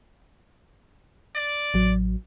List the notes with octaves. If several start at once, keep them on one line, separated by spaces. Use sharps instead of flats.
D5
A1 F#3